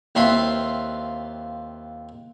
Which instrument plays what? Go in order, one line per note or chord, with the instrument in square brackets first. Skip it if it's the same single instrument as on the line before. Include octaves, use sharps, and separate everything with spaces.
[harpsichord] D#2 C4 E4 F4 B4 C6